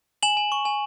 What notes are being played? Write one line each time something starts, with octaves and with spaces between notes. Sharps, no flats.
G#5 E7 F#7
G#5
C#6
G#5